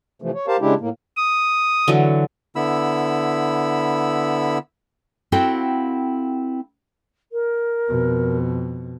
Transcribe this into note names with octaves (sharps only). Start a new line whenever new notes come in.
C3 E3 F3 A3
C#5
G4 A#4 C5 F5 A5
C#3 G#3 D4 E4 G4
A2 A#3
D#6
D3 E3 F#3
D3 B3 E4 B5 E6
C4 E4 F#4 A4 F5 G5
A#4
F2 B2